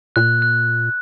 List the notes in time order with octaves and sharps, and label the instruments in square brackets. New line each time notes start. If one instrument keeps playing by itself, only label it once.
[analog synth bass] A#2 [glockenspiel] F#6
[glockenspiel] F#6